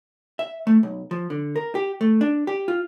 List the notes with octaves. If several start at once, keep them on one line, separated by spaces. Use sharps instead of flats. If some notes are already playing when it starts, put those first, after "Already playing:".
E5
A3
B1
F3
D3
A#4
G4
A3
D4
G4
F4